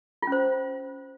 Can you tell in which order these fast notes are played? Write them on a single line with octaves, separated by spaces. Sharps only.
F4 C#4 C5